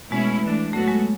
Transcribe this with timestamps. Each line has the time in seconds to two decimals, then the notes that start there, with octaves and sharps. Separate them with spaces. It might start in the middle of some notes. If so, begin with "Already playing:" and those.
0.11 B2 G#3 A3 C#4 E4
0.42 E3 A3 D4
0.73 A2 F#3 A3 B3 F#4 A4
0.88 G#3